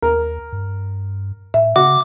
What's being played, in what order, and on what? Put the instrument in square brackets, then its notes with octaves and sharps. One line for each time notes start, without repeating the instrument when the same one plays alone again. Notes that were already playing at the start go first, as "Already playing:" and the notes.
[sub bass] D#2 [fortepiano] A#4
[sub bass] G2
[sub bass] A2 [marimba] E5
[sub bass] C#3 [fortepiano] F#4 [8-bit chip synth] D6